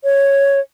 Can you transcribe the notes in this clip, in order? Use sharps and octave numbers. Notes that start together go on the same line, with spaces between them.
C#5